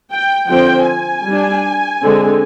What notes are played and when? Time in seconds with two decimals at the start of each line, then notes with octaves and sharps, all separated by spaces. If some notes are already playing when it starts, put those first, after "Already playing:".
0.11 G5
0.49 D3 F3 C4 G5
0.87 G#5
1.25 G3 D4
2.01 D3 G#3 C4